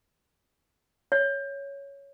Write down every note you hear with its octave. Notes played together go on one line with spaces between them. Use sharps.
C#5